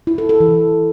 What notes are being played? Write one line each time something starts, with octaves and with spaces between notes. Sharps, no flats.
E4
A4
A4
E3